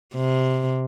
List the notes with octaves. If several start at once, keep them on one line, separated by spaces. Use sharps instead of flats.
C3